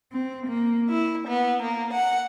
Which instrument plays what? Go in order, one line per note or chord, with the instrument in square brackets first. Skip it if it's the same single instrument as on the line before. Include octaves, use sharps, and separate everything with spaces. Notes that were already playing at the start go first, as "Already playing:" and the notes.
[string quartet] C4
A#3
E4
B3
A#3
F#5